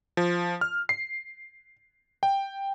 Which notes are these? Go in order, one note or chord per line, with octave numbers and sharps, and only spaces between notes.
F3
F6
C7
G5